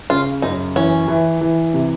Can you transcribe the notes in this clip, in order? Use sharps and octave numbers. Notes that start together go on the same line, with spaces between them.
C#3 F4
F#2 D#4
E3 C#4
E3
E3
C3